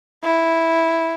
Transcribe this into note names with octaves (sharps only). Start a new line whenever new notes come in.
E4